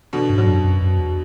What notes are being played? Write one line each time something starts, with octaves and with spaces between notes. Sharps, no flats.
B2 D3
G#2
D3 F#3
F#2
F#2
F#2
E2